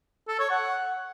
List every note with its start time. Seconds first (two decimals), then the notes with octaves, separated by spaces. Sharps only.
0.28 A4
0.39 C#5
0.51 F#5